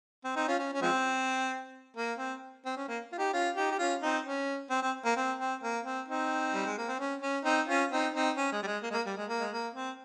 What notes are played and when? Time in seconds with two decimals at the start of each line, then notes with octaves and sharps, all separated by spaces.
0.24 C4
0.36 C4 D#4
0.48 C#4 F4
0.59 C#4
0.73 C#4
0.82 F3 G#3 C4
1.97 A#3
2.18 C4
2.65 C4
2.77 C#4
2.88 A#3
3.13 F4
3.18 D#4 G4
3.33 C#4 F4
3.56 D#4 G4
3.71 G4
3.79 C#4 F4
4.02 C4 D#4
4.25 C#4
4.70 C4
4.82 C4
5.05 A#3
5.17 C4
5.39 C4
5.63 A#3
5.85 C4
6.08 C4 D#4
6.54 G3
6.66 G#3
6.78 A#3
6.88 C4
6.99 C#4
7.22 C#4
7.45 C4 D#4
7.68 C#4 F4
7.92 C4 D#4
8.14 C4 D#4
8.37 C#4
8.52 G#3
8.62 G3
8.67 G#3
8.83 A#3
8.91 G#3
8.94 A#3
9.06 G3
9.17 G#3
9.28 A#3
9.40 G#3
9.52 A#3
9.75 C4